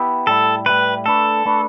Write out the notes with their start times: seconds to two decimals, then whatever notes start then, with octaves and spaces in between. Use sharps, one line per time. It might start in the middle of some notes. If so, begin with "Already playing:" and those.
Already playing: B3 E4 G4
0.27 A2 G3 E4 A4
0.66 A2 G3 E4 B4
1.06 A3 D4 A4 B4
1.45 A3 D4 B4